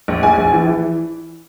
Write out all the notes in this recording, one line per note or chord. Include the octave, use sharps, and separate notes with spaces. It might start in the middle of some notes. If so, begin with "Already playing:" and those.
A#1
A#1 G#5
A#1
E3
E3